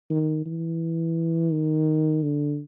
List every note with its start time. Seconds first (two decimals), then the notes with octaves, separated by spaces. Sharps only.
0.10 D#3
0.45 E3
1.52 D#3
2.23 D3